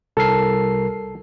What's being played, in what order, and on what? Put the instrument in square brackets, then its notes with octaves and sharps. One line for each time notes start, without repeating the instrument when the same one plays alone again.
[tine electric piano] C2 A#4 C7 [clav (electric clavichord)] A4